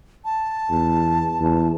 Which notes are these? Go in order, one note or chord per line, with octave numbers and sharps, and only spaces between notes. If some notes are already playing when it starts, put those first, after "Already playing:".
A5
E2
E2